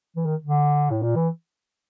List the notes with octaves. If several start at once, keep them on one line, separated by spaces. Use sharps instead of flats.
E3
D#3
D3
A2
A#2
E3